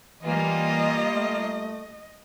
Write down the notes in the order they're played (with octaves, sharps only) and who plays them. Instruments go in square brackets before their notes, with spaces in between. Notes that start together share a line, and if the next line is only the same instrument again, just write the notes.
[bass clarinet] E3 [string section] G3 A#3 F4 [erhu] D#5
[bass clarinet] A3